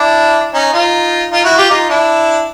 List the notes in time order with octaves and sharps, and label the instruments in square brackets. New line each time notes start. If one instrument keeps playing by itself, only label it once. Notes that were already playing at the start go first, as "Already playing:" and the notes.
Already playing: [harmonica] D4 E4
C#4 D#4
D#4 F4
D#4 F4
E4 F#4
F4 G4
D#4 F4
D4 E4